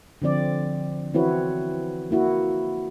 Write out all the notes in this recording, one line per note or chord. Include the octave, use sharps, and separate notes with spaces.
D3 F3 C4 D5
E3 C4 E4 F#4 B4 C#5
A#3 E4 F#4